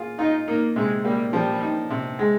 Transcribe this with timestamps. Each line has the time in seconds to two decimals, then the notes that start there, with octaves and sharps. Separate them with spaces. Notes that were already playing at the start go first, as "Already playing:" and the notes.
Already playing: A#3 F4 G#4
0.19 D#4 F4
0.47 A#3 D#4
0.76 C3 G#3
1.04 G3 A#3
1.33 F3 G3
1.62 D#4
1.90 C3
2.19 G#3